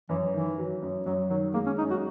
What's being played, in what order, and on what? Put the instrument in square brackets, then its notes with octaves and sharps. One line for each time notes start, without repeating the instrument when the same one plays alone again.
[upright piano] F#2 [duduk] E3
[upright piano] D#3 [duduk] E3
[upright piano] F#3
F#2
[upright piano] F#2 [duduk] F#3
[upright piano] D#3 [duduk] F#3
[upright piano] G#3 [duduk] A#3
[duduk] C#4
[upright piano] F#2 [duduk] D#4
[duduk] F#4